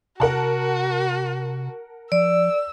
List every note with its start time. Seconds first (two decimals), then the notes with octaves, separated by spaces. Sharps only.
0.20 C3 F#4 A#4 F#5 A5
2.12 F3 D5 E6